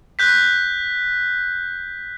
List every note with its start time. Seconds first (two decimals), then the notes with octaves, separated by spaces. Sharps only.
0.19 F#6 G6 B6